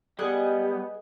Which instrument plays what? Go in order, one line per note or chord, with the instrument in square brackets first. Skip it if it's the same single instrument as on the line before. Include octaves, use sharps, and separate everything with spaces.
[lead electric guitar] G3 [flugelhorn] B3 [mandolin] G#4 D#5 F#5